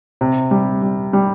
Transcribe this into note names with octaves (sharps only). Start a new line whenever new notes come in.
C3
G3
G3
G3